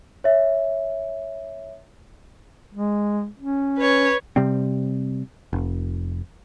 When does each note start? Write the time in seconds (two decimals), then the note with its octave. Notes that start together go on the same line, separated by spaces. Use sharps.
0.24 C#5 E5
2.74 G#3
3.38 C#4
3.78 B4 C#5
4.36 C3 G3 C4
5.53 F1